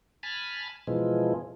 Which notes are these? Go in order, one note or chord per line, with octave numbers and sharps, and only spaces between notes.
G#5 A5 B5 F6
B2 E3 F3 G#3